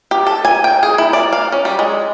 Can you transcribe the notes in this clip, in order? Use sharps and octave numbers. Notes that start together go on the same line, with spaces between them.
G4
A4
G#5
G5
G#4
E4
D5
F5
C#4
G3
G#3